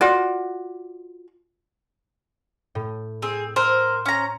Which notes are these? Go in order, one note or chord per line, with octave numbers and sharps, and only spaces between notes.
F4 F#4 D5
A2
C4 G#4
A#4 C5 C6 E6
C#4 A#5